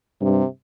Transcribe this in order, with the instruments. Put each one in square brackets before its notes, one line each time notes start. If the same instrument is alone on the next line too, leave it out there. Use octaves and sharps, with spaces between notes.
[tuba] G2 [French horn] C3